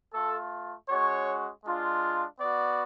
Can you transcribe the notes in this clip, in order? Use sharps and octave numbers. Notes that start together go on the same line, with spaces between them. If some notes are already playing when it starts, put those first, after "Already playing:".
A3 F4 A4
G#3 C#4 F#4 C#5
G#3 D4 F4
B3 F#4 D5